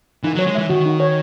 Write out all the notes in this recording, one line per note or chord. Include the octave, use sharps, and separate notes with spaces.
E3 D#4
F#3
C#5
G#3
E3 E5
D#3 F#4
D#4
C#5